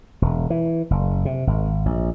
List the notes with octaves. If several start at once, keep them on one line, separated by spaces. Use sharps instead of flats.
E1
E3
F#1
C3
G#1
A#1